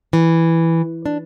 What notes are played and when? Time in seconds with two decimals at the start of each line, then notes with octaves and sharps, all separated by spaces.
0.13 E3
1.06 D4